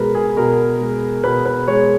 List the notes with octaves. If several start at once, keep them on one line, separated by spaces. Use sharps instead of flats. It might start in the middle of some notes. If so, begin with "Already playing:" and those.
Already playing: B2 G#3 A#4 B4
G#4
B2 A#4
G#3
B2 B4
B4
G#3 C#5